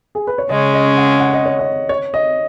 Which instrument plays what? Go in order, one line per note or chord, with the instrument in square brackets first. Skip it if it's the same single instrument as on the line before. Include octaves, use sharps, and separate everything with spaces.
[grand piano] G#4
B4
C#5
[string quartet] C#3 G#3 C#4 [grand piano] D#5
[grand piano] D#5
F#5
F#5
D#5
C#5
D#5
C#5
D#5